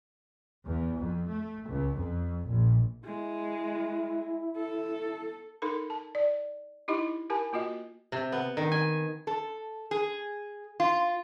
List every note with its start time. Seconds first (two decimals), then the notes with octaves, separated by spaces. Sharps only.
0.66 E2
0.99 F2
1.28 A3
1.68 C#2
1.96 F2
2.45 A#1
3.04 G#3 E4
4.56 A4
5.62 D#4 A4 A#4 B5
5.90 A5
6.15 D5
6.88 D#4 E4 G4 D#5 B5
7.30 G4 A#4 G#5 A5 B5
7.53 A#3 F4 F#4 D#5
8.12 C3
8.32 B3
8.57 D#3
8.72 G#5
9.27 A4
9.91 G#4
10.80 F4